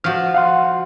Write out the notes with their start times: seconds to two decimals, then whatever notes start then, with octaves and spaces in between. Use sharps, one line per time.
0.04 F3 F#4 F6
0.35 F5 F#5 C6